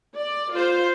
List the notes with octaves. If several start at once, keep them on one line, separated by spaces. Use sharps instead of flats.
D5
F4 C5